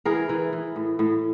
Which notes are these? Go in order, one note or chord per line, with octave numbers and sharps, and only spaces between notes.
E3 G#4 A#4
E3
E3
A2
A2